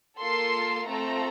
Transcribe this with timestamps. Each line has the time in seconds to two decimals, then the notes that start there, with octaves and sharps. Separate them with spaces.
0.20 A#3 F4 A4 C6
0.87 A3 C4 F4 A4 A#5